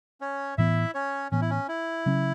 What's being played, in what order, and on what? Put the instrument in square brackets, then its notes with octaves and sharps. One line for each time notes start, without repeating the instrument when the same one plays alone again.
[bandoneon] C#4 C#5
[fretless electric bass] A2 E3 B3 [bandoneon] E4 E5
[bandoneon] C#4 C#5
[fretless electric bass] A2 E3 B3 [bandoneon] C#4
[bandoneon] E4
C#4
E4
[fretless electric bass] C#3 F#3 C#4